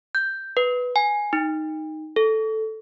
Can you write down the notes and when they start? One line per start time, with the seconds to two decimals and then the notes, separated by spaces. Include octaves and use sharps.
0.15 G6
0.57 B4
0.96 G#5
1.33 D#4
2.16 A4